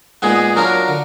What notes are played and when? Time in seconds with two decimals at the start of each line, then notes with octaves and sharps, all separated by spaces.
0.22 A#2 G#3 B3 D#4 G#4
0.56 F#3 D4 F4 A#4
0.88 D3